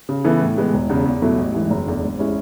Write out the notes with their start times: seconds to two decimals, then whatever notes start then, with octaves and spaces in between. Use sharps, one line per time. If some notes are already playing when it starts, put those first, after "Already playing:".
0.09 C#3
0.24 E3 B3 E4 A4
0.41 A2
0.57 E3 G#3 B3
0.74 E1
0.89 E2 C#3
1.06 E2
1.22 B2 F#3 A3 E4
1.38 A1
1.55 G#2 E3
1.70 F#1
1.87 E2 D3
2.03 G#1
2.19 G#3 C#4 E4